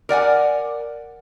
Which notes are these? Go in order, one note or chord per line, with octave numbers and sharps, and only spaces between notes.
A#4 D5 F#5 G#5